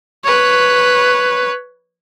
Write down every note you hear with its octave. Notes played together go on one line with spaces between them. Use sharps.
B4 C#5